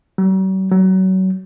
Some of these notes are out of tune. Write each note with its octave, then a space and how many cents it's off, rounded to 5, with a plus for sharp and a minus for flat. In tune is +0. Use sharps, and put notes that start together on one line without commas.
F#3 +45
F#3 +25